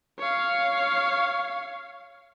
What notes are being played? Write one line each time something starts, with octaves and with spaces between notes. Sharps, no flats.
C#5 F5